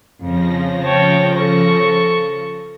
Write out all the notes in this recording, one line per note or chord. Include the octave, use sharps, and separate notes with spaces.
F2 C#3 F3 A#6
C#5 G5 A5
A4 C#6